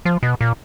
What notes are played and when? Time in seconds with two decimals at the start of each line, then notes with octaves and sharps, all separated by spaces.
0.05 F3
0.23 B2
0.41 A#2